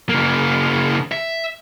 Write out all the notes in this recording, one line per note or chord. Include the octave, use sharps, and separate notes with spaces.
C#3 A#3
E5